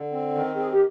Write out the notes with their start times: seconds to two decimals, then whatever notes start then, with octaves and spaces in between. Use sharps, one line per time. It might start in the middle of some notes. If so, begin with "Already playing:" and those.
Already playing: D3
0.12 C4
0.34 D#3
0.55 C4 G#4
0.71 G4